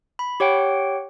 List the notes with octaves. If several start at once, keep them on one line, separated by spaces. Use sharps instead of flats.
B5
G4 C#5 F#5 G5